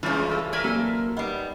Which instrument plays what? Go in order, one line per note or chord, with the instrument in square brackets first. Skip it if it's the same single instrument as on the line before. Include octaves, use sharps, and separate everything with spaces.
[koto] C#3 D4 [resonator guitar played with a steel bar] E3 C#4 [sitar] G3 G#3 F4
[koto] A3 G4
[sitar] A#4 E5 [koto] D5 G#5
[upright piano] F#3 A#3 [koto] A4 C5
[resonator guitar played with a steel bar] G3 B3 [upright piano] D#4